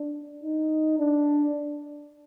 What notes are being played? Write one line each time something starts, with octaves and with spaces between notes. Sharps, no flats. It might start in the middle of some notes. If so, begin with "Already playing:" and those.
Already playing: D4
D#4
D4